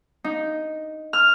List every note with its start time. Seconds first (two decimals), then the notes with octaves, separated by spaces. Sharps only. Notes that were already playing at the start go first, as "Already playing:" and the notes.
0.24 D#4
1.13 F6